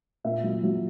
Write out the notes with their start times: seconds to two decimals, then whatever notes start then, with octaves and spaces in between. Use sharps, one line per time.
0.24 A#2 E5
0.44 F#3
0.63 F#3